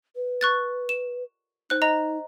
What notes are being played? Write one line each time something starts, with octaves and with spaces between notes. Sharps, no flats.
B4
C#6 F#6 A6
E7
D#4 C5 F#6
D#5 A#5